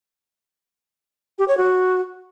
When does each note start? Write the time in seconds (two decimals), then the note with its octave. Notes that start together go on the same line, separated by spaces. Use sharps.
1.39 G4
1.48 C#5
1.57 F#4